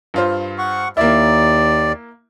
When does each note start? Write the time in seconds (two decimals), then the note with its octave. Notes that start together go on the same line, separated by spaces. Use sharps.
0.14 G2 F4 C5
0.58 F#5 C#6
0.97 D#2 A#3 E4 D5